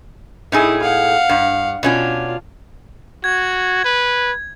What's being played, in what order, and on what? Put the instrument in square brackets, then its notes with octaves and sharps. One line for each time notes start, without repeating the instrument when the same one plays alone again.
[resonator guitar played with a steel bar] A2 D#4 G#4 [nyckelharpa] E4
[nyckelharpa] F5 F#5
[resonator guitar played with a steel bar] G2
[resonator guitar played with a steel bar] B2 C#4 D4 [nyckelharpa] F4
[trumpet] F#4 [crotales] G#6
[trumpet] B4